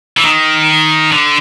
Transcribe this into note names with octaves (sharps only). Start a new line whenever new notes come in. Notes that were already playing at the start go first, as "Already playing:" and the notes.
E3
D#3
D3